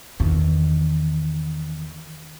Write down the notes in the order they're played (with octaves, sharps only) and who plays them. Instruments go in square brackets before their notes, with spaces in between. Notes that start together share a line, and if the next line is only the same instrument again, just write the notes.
[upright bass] E2 D#3